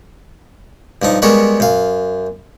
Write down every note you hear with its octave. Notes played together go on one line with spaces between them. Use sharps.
G2 F3 D#4
G3 G#3 B3 A#4 C#5
F#2 F5